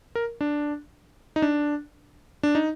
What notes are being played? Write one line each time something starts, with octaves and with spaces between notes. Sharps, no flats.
A#4
D4
D#4
D4
D4
D#4